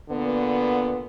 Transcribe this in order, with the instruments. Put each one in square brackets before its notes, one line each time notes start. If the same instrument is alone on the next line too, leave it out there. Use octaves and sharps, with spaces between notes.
[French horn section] A#2 D3 B3